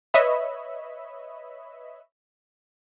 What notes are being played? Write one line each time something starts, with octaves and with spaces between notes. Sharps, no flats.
B4 C#5 D#5 E5 B5